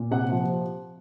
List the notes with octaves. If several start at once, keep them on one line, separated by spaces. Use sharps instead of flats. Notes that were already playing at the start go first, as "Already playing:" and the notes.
Already playing: A#2
C3 F#5
F3